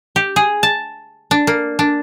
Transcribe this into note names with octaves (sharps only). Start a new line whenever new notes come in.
G4
G#4
A5
D4
A#3
D4